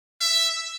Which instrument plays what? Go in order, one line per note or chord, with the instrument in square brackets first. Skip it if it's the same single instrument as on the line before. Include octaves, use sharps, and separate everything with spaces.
[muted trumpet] E5